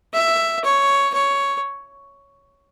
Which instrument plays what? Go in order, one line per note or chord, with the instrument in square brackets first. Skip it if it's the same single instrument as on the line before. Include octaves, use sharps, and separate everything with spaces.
[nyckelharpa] E5
C#5
C#5